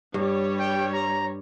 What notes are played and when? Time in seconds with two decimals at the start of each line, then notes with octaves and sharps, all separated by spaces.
0.14 G2 G3 C#5
0.59 G5
0.93 A#5